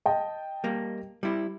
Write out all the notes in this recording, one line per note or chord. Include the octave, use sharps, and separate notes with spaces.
D#5 G5 A5
G3 A#3
G3 E4